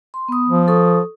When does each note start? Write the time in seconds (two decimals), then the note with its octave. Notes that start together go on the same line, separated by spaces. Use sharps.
0.14 C6
0.28 B3 D#6
0.48 F3
0.68 A4 C#6 D#6